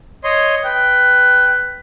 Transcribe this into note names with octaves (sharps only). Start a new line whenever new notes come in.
C#5 D#5 C6
B4 G5